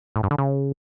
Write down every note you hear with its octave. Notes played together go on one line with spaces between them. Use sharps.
A2
G2
D3
C#3